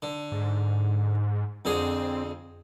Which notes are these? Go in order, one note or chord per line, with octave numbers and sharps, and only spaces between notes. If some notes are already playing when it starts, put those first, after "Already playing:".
D3
G#2
F2 D3 C4 G#4